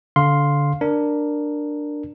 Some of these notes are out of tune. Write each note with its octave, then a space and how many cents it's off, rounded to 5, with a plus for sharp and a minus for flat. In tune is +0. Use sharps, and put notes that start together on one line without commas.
D3 -20 F5 +5 C6 +0
D4 +5 A#4 +0